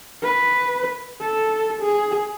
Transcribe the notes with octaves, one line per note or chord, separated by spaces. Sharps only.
B4
A4
G#4